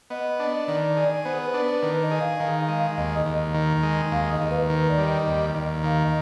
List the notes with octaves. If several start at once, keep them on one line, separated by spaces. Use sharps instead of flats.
B3 D#5
D4
D#3 D5
G#4
B3 C5
B4
D4
B4
D#3 B4
D#5
G#4
F5
D#3
G#3
D#2 D#5
D#5
D#2
D#3
G#3
D#2 F5
D#5
D#2
B4
D#3 B4
D5
G3
D#5
D#2
D#2
D#3 F5
D#5